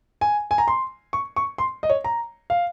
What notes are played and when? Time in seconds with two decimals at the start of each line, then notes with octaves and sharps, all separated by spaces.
0.21 G#5
0.51 G#5
0.58 A#5
0.68 C6
1.13 C#6
1.36 C#6
1.58 C6
1.83 D#5
1.90 C#5
2.04 A#5
2.50 F5